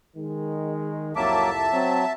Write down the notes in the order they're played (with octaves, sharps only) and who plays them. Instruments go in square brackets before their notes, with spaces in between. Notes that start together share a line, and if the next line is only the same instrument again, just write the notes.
[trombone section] D#3 G#3
[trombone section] C2 F2 [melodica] F#3 A#3 D6 [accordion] E5 A5
[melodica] F#3 [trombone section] C4